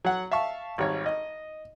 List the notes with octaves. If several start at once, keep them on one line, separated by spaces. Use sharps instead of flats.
F#3 F#5
E5 F5 A5 C#6
G#1 G3 C#5
D#5